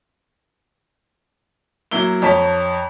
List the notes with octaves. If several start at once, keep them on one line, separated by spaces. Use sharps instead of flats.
F#3 A#3 E4 G7
F2 C#5 A5 A#5 B6